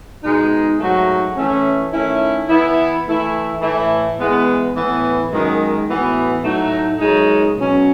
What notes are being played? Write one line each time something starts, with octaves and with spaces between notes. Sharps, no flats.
B2 G#3 D#4
G#2 F#3 A3 D#4 F#4
E3 A3 C#4
D#3 A3 C#4 E4
E3 B3 E4
E3 A3 E4
A2 E3 A3 E4
E3 G#3 B3 E4
A2 E3 B3
F#2 D#3 G#3
A2 E3 B3 F#4
A2 F#3 A3 D#4 F#4
F#2 C#3 G#3 D#4
B2 F#3 C#4